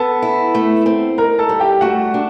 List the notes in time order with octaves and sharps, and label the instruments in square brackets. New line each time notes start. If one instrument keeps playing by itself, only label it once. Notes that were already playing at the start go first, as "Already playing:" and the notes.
Already playing: [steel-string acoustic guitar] B3 [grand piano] A4 A5
[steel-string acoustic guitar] E4
A3
C4
[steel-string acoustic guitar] D#4 [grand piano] A#4 A#5
[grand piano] A4 A5
[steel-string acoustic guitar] G3
[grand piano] G4 G5
[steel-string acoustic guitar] A3 [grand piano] F#4 F#5
[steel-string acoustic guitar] D4